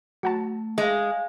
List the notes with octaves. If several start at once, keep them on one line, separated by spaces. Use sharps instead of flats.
F#3 A3 F#4 A5
G#3 F5 G#5